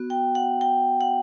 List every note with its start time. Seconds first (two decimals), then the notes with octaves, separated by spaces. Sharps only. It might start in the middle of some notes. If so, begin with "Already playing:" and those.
Already playing: B3 F#4
0.10 G5
0.35 F#5
0.61 G5
1.01 F#5